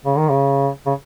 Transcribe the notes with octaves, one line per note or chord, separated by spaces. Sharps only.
C#3
D#3
C#3
C#3